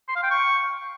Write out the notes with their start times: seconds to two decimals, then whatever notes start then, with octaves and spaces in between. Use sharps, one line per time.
0.09 C6
0.16 F5
0.23 G5
0.31 C#6